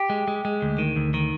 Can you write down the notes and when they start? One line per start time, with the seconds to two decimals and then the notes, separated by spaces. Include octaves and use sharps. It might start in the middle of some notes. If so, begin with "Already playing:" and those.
Already playing: G4
0.10 G#3
0.28 G#3
0.45 G#3
0.62 D2
0.78 D#3
0.96 D2
1.14 D#3